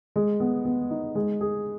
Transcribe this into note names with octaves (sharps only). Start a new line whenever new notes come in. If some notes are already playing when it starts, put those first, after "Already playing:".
G#3
B3
B3
D#4
G#3
G#4